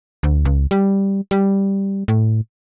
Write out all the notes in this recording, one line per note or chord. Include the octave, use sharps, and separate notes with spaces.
D2
C#2
G3
G3
A2